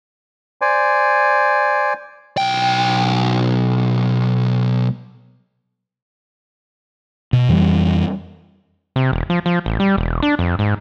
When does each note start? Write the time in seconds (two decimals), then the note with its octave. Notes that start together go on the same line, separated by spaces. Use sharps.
0.61 C5 D5 G#5
2.37 B1 G5
7.33 B2
7.49 F2 E3 F#3 G3
8.96 C3
9.13 E1
9.30 F3
9.46 F3
9.66 A1
9.80 G3
9.98 E1
10.23 D4
10.39 F2
10.59 G#2